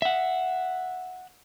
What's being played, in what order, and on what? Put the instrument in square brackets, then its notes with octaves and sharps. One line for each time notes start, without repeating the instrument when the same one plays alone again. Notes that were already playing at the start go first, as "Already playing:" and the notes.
[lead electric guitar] E5 F#5